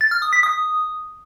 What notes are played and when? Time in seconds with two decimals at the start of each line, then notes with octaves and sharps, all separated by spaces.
0.01 A6
0.11 F6
0.22 D#6
0.33 B6
0.43 D#6